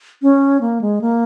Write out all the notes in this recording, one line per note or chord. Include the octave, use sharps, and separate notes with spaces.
C#4
A#3
G#3
A#3